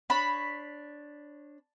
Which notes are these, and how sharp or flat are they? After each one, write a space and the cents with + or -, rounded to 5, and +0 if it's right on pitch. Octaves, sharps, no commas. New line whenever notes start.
D4 +0 C#5 -20 B5 +0